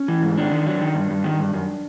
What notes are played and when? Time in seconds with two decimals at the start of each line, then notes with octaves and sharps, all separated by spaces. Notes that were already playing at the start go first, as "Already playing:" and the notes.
Already playing: C#4
0.08 E3
0.23 G#2
0.37 D#3 D4
0.52 D#3
0.66 F#3
0.81 D#3
0.96 G2
1.10 G2
1.24 D#3
1.39 G2
1.54 F#2